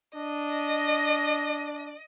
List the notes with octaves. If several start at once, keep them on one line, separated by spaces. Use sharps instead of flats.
D4 D#5